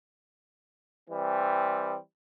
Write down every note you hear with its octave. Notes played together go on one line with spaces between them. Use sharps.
E3 G3 C4